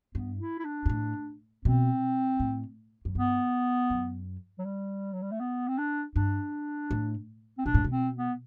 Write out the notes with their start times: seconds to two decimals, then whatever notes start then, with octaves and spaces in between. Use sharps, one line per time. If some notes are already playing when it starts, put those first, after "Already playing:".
0.14 G2 B3
0.40 E4
0.59 E4
0.65 D4
0.86 G2
0.89 A2
1.65 B2 C4
2.40 A2
3.05 F#2
3.15 G2 B3
3.90 F#2
4.59 F#3
4.65 G3
5.13 F#3
5.22 G3
5.32 A3
5.40 B3
5.68 C4
5.78 D4
6.15 G2 D4
6.91 A2
7.58 C4
7.66 B2 D4
7.74 A2
7.84 B2
7.91 C4
8.16 B3